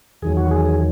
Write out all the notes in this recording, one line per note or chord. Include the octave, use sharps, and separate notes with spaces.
E2 D#3 F#3 G#4
F#4
G#4
G#4